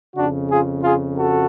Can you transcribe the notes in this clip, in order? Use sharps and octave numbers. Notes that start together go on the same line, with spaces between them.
F2 C#3 D4 F#4
F4 G#4
F4 G#4
F#4 A4